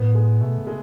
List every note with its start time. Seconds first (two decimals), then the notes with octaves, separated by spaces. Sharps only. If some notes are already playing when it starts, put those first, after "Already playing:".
Already playing: A2 B3
0.15 G#3
0.41 B2 A3
0.58 C#3
0.67 G#3